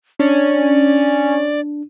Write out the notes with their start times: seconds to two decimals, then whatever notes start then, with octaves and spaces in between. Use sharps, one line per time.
0.20 C#4 D4 D5